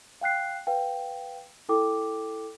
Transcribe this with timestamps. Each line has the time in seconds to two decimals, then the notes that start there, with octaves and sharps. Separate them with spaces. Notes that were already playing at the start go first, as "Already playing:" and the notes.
0.21 F5 G5 F#6 C7
0.67 B4 F5 G5
1.69 E4 A4 G5 D6